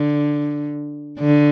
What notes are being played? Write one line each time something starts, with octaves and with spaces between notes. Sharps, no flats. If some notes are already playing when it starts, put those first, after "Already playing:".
Already playing: D3
D3